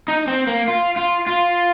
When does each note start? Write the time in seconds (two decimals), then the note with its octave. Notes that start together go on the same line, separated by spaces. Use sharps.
0.08 D#4
0.28 C4
0.47 A#3
0.68 F4
0.96 F4
1.27 F4